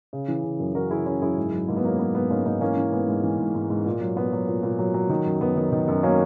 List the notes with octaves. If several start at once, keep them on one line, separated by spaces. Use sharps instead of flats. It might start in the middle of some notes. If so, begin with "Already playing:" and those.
C#3
E3
C#3
F#2
E3 F#4 A#4
C#3 E4 G#4
C#3 C#4 E4
F#2 E4 G#4
G#2
F#3
G#2 A#3
B3
F#3 A#3
F#3 B3
G#2 B3
G#2 A#3 C#4
G#2 B3 D#4
E3 A#3 C#4
E3
G#2 B3
G#2
E3
G#2
G#2
G#2
A#2
F#3
A#2 B3
F#3
A#2
A#2
F#3
F#3
D#3
F#2
F#2 B3
D#3
D#3
F#2
F#3 A#3 C#4